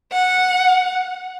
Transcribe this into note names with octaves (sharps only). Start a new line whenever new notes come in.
F#5